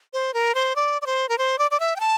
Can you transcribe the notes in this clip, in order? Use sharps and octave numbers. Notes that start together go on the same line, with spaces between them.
C5
A#4
C5
D5
D5
C5
A#4
C5
D5
D5
E5
G5
A5